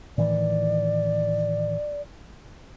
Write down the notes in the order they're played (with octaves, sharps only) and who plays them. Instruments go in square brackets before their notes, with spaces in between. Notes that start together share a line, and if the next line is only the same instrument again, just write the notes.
[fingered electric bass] A2 D#3 E3 [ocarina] D5